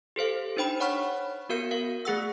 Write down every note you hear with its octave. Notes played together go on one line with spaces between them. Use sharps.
G4 A4 C5 F5
D4 D#4 C5 G5 B5
C#5 F#5 B5 C#6 F6
B3 F#4 A#4 F5 G6 C#7
A#4 F5
A3 G#4 F#5 E6